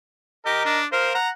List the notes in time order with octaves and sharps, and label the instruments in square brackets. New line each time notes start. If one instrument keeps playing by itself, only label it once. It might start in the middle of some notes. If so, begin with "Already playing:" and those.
[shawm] G4 [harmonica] A#4 D#5
[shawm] D4
[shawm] A#4 [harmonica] C5 F5
[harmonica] F#5 [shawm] A#5